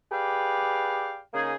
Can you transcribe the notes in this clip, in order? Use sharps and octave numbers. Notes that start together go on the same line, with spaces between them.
G4 G#4 B4 D5 F5 G5
C#3 A#3 D#4 G#4